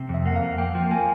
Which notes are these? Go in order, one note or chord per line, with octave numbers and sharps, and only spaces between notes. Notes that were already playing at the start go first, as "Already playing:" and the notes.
Already playing: C3
F2 E5
A#3 F#5
F5
F2
A#3 G5
F3
A#3 G#5